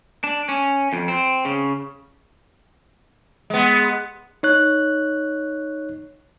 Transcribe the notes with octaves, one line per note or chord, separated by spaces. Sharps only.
D4
C#4
F2
C4
C#3
G#3 B3
D#4 C#5 F#6